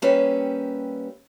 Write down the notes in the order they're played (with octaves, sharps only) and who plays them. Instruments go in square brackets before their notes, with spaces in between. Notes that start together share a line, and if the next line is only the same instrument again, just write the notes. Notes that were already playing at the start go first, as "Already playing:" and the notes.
[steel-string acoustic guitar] G3 A#3 C#4 G4 B4 E5